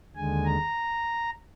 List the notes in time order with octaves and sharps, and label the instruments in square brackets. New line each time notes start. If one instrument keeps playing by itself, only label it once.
[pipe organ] D#2 D3 G#3 G#5
A#5